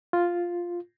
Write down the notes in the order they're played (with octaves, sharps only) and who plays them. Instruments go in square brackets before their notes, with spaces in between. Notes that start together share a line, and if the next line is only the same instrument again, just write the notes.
[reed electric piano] F4